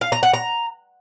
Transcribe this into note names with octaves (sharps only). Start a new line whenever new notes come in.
F5
A#5
F#5
A#5